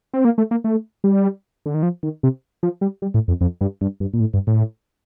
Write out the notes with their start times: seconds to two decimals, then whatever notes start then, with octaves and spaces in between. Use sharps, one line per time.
0.13 C4
0.25 A#3
0.38 A3
0.51 A#3
0.64 A3
1.04 G3
1.66 D3
1.74 D#3
1.83 F3
2.03 D#3
2.23 C3
2.63 F3
2.81 G3
3.02 G3
3.14 A2
3.28 F2
3.41 F2
3.61 G2
3.81 G2
4.00 G2
4.13 A#2
4.20 A2
4.34 G2
4.47 A2